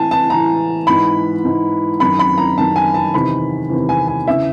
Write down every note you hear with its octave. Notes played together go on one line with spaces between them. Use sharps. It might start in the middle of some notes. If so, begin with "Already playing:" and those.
Already playing: A2 E3 G#5 A5
A5
A2 E3 A#5
G#2 E3 B5
G#2 E3
F#2 D#3 B5
B5
A#5
F#2 D#3 A5
G#5
A5
E2 C3 D#3 B5
E2 C3 D#3
G#5
G#5
E2 C#3 E3 E5